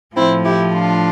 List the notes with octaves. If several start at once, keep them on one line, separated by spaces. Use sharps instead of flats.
A2 F3 C4 E4
E4 G4
D4 F4